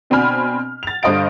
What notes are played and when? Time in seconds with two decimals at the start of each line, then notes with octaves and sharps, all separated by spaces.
0.10 B2 C4 D4 G#5 B5 F6
0.83 A6 F7
1.03 G2 D3 C5 D#5 F5 D7